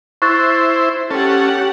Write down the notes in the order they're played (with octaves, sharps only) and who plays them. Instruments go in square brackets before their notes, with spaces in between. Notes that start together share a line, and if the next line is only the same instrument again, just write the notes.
[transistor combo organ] E4 C5 [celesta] C#6 F#6 A6
[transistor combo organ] C#4 A4 [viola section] G4 F#5